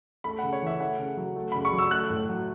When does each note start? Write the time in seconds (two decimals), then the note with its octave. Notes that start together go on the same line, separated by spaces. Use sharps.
0.24 A3 B5
0.39 C#3 F#5
0.53 C#5
0.62 E3 E5
0.80 A3 F#5
0.99 C#3
1.17 F#3
1.36 A3
1.52 C#3 B5
1.65 C#6
1.73 F#3
1.78 E6
1.91 A3 F#6
2.10 A2
2.29 F#3